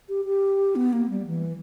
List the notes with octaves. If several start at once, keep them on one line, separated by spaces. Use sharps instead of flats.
G4
G4
B3
A#3
G3
E3